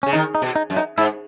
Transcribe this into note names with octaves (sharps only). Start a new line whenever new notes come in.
C#3 C#4
D#3 D#4
D#4
B2
D#4
F#2
D#4
G#2 E4